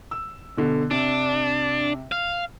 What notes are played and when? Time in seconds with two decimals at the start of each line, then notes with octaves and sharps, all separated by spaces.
0.11 E6
0.57 B2 D3
0.91 C3 D4
2.12 F5